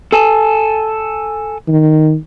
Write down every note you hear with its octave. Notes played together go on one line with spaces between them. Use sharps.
A4 G#5 A5
D#3